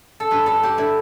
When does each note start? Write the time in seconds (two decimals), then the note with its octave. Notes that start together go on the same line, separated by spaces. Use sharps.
0.20 A4
0.31 G2 B4
0.46 D3 A4
0.63 D3 G4
0.78 D3 E4